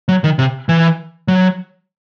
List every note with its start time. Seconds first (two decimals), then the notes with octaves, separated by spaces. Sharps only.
0.08 F#3
0.24 D#3
0.39 C3
0.69 E3
1.28 F#3